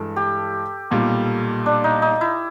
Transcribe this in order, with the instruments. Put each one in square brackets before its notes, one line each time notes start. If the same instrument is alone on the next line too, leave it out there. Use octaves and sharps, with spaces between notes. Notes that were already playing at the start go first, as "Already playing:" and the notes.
Already playing: [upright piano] G2 E3 G#3 [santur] A4
[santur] G4
[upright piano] B1 A#2 G3
[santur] D4
D#4
D#4
E4